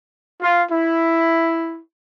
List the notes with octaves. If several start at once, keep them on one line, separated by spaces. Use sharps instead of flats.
F4
E4